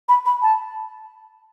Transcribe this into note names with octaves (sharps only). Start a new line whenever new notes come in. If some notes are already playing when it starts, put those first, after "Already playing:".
B5
B5
A5